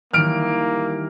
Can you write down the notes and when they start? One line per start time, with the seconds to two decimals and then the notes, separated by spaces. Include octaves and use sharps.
0.13 D#3 E3 G3 A#3 F6 D7